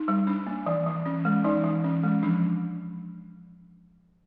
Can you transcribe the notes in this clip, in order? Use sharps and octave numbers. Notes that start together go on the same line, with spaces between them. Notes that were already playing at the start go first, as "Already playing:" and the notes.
Already playing: D#4
G3
D4
A#3
E3
E3
C#4
G#3
E3 D#4
E3
C#4
G#3
F3 D4